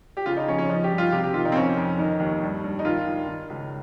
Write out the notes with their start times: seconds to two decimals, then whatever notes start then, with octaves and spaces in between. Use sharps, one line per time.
0.17 G4
0.26 C#3 F4
0.37 D#4
0.47 F3 C#4
0.58 C#4
0.69 F3 D#4
0.84 G4
0.91 G2
0.98 F4
1.12 C3 G4
1.23 G4
1.34 D#3 F4
1.45 D#4
1.52 C4
1.56 F2 C#4
1.77 F2
1.98 D#3 D#4
2.20 D#2
2.42 G2
2.64 G2
2.79 D#4
2.85 D#3 F4
3.06 D#3
3.28 D#3
3.49 C#2